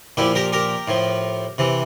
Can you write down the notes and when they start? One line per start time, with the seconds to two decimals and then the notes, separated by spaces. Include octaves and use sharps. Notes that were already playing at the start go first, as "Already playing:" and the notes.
0.17 A#2 F3 E4 G4
0.35 G4 A#4
0.53 G4 A#4
0.88 A2 F3
1.58 C3 E3